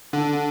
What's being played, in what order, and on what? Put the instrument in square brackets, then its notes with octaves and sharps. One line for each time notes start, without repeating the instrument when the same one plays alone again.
[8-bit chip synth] D3